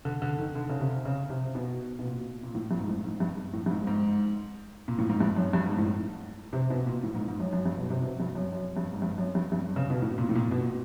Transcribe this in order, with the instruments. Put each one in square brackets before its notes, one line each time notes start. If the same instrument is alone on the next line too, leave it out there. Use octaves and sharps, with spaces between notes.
[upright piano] D3
D3
D#3
D3
C#3
C3
C#3
C3
B2
B2
A#2
A#2
A2
G2
G#2
A2
G#2
G2
A2
G2
G#2
G#2
A#2
A2
G#2
G2
F#2
G2
G#2
A2
C3
B2
A#2
A2
G#2
G#2
F#2
F#2
G2
B2
C3
B2
G2
F#2
F#2
G2
G#2
G2
F#2
G2
G2
C#3
B2
A2
A#2
A2
A#2
B2